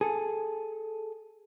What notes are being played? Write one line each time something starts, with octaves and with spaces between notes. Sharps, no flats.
G#4 A4